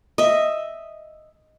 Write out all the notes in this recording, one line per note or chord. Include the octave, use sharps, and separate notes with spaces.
D#5 E5